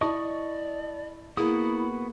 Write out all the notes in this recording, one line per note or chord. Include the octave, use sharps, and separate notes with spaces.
E4 D5 D#5 A5 C#6 D#6
A#3 B3 E4 F#4 G#4 D#6